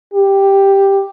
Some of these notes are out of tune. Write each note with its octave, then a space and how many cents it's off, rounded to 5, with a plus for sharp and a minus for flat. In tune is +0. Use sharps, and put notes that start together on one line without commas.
G4 +5